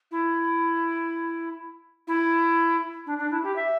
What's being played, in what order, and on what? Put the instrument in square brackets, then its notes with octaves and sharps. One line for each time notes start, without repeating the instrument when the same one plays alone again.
[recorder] E4
E4
D4
D4
E4
G4
E5